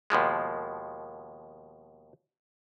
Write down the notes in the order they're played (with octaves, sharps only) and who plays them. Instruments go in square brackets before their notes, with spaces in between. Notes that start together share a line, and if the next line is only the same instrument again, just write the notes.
[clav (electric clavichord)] D#2 B2 F3 G#3